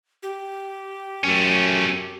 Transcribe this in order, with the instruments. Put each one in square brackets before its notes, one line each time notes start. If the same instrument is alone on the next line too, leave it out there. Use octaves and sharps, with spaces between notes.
[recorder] G4
[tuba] F#2 [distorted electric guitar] A3 C#4